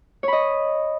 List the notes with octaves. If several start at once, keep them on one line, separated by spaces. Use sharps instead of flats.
C#5 D#5 B5